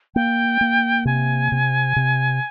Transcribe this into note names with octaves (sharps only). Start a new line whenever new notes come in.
A#3 G5
A#3
C3 G#5
C3
C3